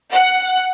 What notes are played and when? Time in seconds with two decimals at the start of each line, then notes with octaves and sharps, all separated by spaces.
0.13 F#5